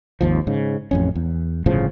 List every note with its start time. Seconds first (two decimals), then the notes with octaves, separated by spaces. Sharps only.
0.21 G#1 D#2 F3
0.47 G#2 C#3
0.91 A1 F2 C#4
1.15 E2
1.66 G1 A2 C#3 F3